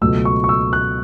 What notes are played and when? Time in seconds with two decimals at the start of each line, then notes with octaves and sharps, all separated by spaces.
0.01 C#2 B2 F#3 A3 E6
0.25 C#6
0.44 C#6
0.49 E6
0.73 F#6